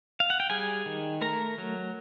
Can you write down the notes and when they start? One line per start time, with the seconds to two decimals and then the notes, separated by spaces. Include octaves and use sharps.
0.20 F5
0.30 F#5
0.40 G5
0.50 G3 G#4 G#5
0.86 D#3
1.21 A3 A#4 A#5
1.58 F#3